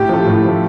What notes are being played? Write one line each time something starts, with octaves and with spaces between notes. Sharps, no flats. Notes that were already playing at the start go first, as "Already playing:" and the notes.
Already playing: A2 G4
F3 A3
A2
F3 A3